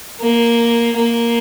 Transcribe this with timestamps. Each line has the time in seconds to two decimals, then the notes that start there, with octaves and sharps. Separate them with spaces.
0.21 A#3
0.96 A#3